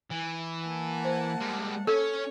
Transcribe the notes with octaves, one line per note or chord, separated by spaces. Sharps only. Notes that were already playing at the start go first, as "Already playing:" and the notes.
E3
A#3 F#5 A5
C5
G3 G#3
C#4 A4 C#5